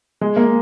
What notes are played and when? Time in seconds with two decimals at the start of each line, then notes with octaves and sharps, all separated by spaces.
0.21 G#3
0.36 A#3